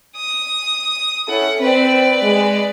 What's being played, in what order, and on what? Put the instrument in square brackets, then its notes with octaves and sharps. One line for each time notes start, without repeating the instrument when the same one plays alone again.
[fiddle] D#6
[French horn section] C#4 E4 A4 [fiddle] F#5
[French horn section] C4 [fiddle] B4 D5
[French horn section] G#3